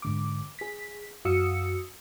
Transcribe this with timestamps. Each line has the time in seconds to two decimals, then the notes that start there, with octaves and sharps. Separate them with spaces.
0.02 G#2 D3 D6
0.59 G#4 B6
1.25 F#2 F#4 F5 D#6 E6 C#7